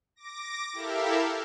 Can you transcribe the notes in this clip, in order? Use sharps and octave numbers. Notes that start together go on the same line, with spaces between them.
D6 A#6
E4 G4 A4 A#4 E5 F5